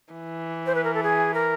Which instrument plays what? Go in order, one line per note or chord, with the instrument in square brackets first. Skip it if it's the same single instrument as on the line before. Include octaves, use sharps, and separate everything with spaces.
[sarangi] E3
[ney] C5
B4
A#4
A4
G#4
A#4